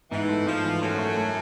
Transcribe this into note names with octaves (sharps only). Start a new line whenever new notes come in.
G#2 E3
A3
G#2 F3
E3
F#2 F#3 A3
A3
A3